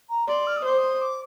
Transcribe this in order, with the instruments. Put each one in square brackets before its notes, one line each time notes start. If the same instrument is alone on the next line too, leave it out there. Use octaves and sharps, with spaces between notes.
[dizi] A#5
[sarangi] D5 [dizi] C6
[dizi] F6
D#6
[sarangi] C5 [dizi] D6
[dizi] D#6
D6